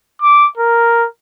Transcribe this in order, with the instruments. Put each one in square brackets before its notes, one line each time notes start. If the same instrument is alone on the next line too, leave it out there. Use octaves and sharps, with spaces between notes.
[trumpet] D6
A#4